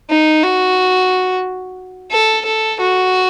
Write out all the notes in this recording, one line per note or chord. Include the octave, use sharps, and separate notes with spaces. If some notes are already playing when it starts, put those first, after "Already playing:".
D#4
F#4
A4
A4
F#4